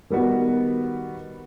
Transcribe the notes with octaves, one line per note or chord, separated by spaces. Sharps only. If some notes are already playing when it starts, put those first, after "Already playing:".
D#3 G3 B3 F#4